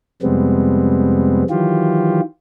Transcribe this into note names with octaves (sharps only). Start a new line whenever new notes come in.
F2 C3 G3 G#3 B3 C4
D#3 E3 F#3 F4 G4